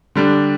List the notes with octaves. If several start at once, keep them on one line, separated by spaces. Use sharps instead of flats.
D3 G3 D4